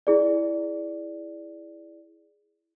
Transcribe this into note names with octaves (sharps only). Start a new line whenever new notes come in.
E4 G#4 D5